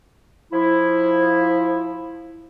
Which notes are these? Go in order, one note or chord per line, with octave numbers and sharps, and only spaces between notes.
F3 E4